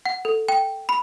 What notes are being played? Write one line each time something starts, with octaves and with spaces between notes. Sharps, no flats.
F#5
A4
G5
B5